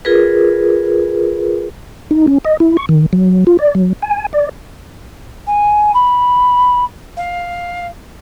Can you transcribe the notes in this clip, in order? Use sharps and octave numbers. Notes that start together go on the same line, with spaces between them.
F4 G#4 A#4 B4
D#4
C#4
D#5
E4
C#6
D#3
F#3
F4
D5
F#3
G#5
D5
G#5
B5
F5